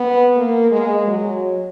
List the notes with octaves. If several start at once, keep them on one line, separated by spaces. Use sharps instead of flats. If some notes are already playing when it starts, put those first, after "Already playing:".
Already playing: B3
A#3
G#3
F#3